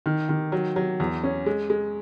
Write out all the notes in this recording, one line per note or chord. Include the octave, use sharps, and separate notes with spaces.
D#3
D#3
F#3
F#3
E2
C#4
G#3
G#3